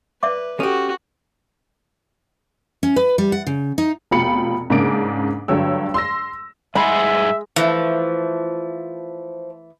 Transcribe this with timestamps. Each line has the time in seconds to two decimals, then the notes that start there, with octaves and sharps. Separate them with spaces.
0.23 B4 D5 E5 D6
0.60 C#4 F#4 G4 A4
2.83 C#4
2.96 B4
3.18 G3
3.32 F#5
3.47 C#3
3.78 D#4
4.11 F1 B2 F4 G5 B5 C#7
4.70 G#2 C#3 A#3 D4 D6 D7
5.48 G2 D3 F#3 C#5 G5 E6
5.94 C6 E6 A#6
6.75 G2 G#3 G#4 E5 F#5 B5
7.56 E3 F3 A3